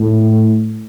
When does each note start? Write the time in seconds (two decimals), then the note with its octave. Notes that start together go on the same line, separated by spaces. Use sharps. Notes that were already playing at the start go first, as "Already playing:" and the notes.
Already playing: A2